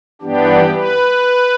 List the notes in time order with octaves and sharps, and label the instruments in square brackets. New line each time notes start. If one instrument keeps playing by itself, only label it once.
[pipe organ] G2 E3 B3 D4 G4
B4